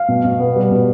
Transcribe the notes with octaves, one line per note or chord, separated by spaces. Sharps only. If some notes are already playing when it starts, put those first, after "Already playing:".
Already playing: F5
B2
B2
B3
G3
B2